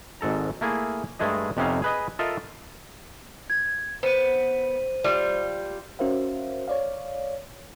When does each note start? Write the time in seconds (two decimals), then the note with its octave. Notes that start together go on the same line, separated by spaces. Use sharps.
0.21 G#1 G#2 A4 A#5
0.61 A3 A#3 E4 G#4
1.19 G2 G#3 A3 G#4 D#5
1.57 F2 C3 B3 C#4 D#4 F5
1.82 G#4 B4 D#5
2.19 F4 A4 A#4 D#5 E5
3.50 G#6
4.03 B3 C5 D#7
5.04 G3 F4
5.99 C#4 F#4 A#4 C5 E5 F5
6.68 C#5 D5 F5